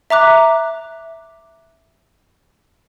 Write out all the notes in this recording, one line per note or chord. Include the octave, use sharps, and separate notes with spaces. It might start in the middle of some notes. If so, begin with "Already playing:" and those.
E5 A#5 D6 F#6